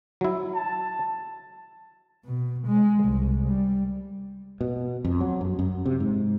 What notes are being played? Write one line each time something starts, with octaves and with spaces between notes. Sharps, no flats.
F#3 E4
A5
B2
G#3
C2
G3
B2
F2
F#3
F#2
F#2
C3
G#2